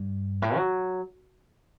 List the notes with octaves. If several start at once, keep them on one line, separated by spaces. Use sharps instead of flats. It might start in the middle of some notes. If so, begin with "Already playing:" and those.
Already playing: G2
A2
F#3